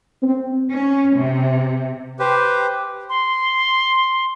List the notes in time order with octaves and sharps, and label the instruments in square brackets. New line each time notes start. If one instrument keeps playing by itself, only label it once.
[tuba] C4
[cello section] C#4
C3
[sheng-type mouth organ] G4 B4 C5
[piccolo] C6